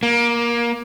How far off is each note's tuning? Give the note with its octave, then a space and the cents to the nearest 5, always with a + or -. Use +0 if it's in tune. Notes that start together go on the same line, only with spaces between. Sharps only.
A#3 +20